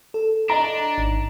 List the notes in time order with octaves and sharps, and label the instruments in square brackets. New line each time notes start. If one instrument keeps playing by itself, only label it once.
[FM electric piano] A4
[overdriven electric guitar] D4 [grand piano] D#5 A#5
[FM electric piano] G#1